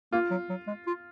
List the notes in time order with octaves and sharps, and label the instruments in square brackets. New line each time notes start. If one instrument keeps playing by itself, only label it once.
[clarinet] A#3 [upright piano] F4
[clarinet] F#3
F#3
G#3
F4